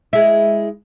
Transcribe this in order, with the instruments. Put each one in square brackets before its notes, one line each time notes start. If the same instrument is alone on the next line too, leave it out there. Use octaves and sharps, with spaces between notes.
[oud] G#3 E4